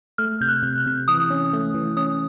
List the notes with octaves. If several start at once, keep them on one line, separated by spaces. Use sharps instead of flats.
A3 F6
C3 G6
F#6
C3
C3
E3 D#6
C#4
A3
E3
C#4 D#6